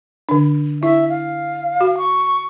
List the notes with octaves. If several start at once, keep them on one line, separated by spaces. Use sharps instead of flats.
D3 D4
E4 E5
F5
F#4
C#6